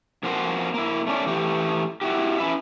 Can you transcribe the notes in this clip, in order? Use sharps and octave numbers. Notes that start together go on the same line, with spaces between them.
F2 A#3 F#4 C5
A#3 E4
A3 C#4 D5
E3 A3 G4
E4 F#4 G4
C#4 E4 B4 E5